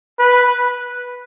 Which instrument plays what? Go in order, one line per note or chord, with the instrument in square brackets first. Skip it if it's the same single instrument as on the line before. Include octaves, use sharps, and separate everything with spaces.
[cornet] B4